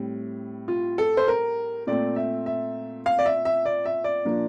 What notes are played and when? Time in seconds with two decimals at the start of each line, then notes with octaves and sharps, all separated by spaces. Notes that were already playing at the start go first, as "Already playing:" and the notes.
Already playing: A2 G3 C4
0.68 F4
0.98 A4
1.17 C5
1.28 A#4
1.87 A#2 A3 C4 D5
2.16 E5
2.46 E5
3.06 F5
3.19 D5
3.26 E5
3.45 E5
3.65 D5
3.86 E5
4.04 D5
4.25 A#2 F3 A#3 D4